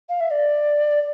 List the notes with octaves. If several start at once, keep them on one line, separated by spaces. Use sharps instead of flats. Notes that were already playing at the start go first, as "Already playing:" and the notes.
F5
E5
D5